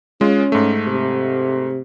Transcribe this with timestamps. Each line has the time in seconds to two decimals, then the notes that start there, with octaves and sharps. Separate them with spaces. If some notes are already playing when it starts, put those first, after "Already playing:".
0.21 G#3 C#4 F4
0.52 G#2 A3
0.87 C3